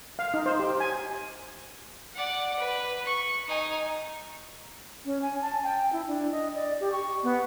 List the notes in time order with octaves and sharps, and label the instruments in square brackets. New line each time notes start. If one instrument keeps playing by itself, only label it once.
[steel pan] F5
D#4
C5
G4
G#5
[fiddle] D5 F#5
B4
C#6
D#4 G#5
[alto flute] C#4
G#5
A5
G5
E4
D4
D#5
D5
G4
C#6
B3